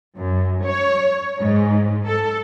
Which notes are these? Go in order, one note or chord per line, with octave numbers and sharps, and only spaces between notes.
F#2
C#5
G#2
A4